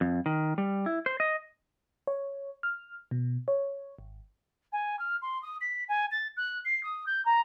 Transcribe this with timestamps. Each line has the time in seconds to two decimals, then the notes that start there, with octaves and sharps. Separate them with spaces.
0.01 F2
0.26 D#3
0.58 G3
0.86 E4
1.06 C5
1.20 D#5
2.07 C#5
2.63 F6
3.11 B2
3.48 C#5
3.99 G#1
4.72 G#5
4.99 F6
5.22 C6
5.42 D#6
5.61 B6
5.88 G#5
6.11 A6
6.37 F#6
6.65 C7
6.83 D#6
7.06 G6
7.25 A#5